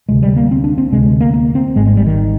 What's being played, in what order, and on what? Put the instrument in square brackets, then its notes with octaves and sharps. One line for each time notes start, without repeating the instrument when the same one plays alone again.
[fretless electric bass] D2 C3 G#3
G3
A#3
C4
D4
C4
D2 C3 G#3
A#3
A#3
C4
G#1 G#2 G#3
G#3
G3
D#3